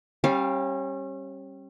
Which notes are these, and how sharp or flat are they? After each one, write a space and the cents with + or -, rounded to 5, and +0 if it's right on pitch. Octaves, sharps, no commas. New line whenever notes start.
G3 +0 C#4 -30 F5 +0